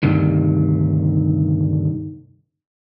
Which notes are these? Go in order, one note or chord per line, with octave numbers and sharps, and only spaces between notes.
D2 G2 C3 D#3